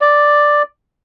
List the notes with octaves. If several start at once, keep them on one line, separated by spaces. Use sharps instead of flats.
D5